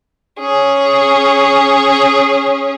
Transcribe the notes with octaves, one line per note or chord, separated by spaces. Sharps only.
C#4 G#4